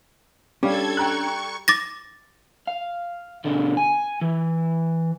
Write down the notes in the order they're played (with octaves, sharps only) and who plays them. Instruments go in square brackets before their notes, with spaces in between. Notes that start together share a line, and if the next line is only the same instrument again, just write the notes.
[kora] G3 [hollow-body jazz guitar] C#4 D4 F5 [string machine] A4 G#6
[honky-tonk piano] G5 A#5 F#6 [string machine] C#6
[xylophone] D6 A6 A#6
[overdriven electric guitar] F5
B2 D3
G#5
E3